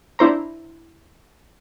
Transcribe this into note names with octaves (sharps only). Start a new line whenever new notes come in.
D4 E4 C5 A#5